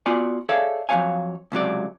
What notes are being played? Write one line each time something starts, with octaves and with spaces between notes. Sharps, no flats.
B3 F4 F#4 D5 G#5
G#4 A4 C#5 D5 E5 F5
F2 F#3 G3 C#5 F5 G#5
C#2 C3 F#3 D5